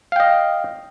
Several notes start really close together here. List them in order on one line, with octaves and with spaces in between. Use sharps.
F5 G5 D#5